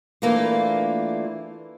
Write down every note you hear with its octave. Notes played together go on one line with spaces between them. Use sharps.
E3 A3 A#3 D4 F4